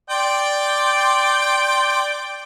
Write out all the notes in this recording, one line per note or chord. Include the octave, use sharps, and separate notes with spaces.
D5 G5 C6